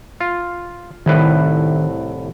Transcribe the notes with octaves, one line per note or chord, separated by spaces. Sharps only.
F4
C2 A2 D#3 B4